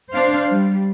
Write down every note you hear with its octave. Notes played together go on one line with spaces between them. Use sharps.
D4 C5 F5
G3